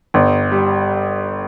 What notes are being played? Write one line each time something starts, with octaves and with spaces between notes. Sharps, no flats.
G1
G3